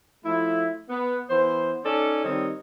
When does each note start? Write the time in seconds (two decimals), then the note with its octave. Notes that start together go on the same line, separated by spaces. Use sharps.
0.25 F3 A3 E4
0.89 B3
1.30 E3 B3 C5
1.84 C#4 D#4 A4 C#5 D5
2.23 D#3 G3 C4 C#5 D#5